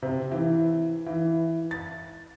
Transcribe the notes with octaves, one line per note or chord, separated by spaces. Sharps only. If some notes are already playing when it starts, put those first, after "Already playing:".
C3
E3
E3
A6